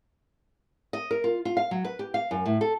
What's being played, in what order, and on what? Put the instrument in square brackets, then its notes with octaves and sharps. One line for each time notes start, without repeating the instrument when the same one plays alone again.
[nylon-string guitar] D#5
A#4
F4
F4
F5
F#3
B4
G4
F5
F#2
A2
A4